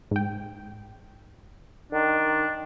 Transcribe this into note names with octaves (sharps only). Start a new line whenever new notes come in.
G#2 G5
D#3 D4